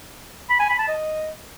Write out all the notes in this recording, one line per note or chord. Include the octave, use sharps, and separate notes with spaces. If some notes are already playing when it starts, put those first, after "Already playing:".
B5
G#5
B5
A5
D#5